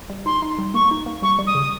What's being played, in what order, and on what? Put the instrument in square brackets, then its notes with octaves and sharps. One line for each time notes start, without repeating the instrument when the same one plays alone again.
[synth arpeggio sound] G3
[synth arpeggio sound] D#4 [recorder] C6
[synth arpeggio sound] D#4
G3
[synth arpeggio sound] A#3 [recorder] C#6
[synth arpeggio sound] D#4
A#3
[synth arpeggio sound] G3 [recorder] C#6
[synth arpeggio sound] G3
[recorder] D#6
[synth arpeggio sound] C#3